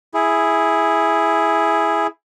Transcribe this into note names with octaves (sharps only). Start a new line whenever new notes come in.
E4 G#4